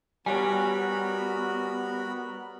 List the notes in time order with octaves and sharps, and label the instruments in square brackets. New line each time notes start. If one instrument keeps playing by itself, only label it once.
[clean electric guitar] G3 [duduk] B3 [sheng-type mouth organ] F#4 A#4 B5 [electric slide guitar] C#5 G5 G#5